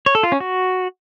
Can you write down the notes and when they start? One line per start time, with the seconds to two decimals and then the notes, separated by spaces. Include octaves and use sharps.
0.06 C#5
0.15 A4
0.23 F4
0.32 C#4
0.40 F#4